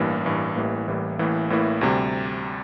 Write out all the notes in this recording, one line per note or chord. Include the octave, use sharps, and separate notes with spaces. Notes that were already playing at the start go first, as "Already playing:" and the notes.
Already playing: A1 G2 E3 A#3
A1 G2 E3 A#3
A1 A2 E3 G3 A#3
A1 A2 E3 G3 A#3
A1 A2 E3 A#3 E4
A1 A2 E3 A#3 E4
D2 C3 G3